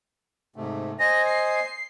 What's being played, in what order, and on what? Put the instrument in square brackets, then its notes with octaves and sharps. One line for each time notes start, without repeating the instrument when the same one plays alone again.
[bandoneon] G#2 C3 A3
[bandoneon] C5 D#5 G#5 [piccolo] A#6
[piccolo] C7